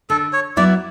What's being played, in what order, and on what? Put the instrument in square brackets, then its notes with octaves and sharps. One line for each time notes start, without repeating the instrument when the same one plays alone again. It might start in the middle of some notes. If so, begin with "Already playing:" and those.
[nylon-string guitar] D3 [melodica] A4
[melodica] C#5
[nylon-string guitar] F#3 B3 E4 [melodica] D5